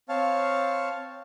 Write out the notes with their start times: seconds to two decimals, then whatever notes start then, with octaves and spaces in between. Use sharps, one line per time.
0.09 C4 C#5 F5 A5